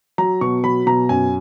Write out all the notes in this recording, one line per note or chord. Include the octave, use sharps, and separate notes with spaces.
F#3 A#5
B2 C#6
F#3 B5
B2 A#5
F#2 G#5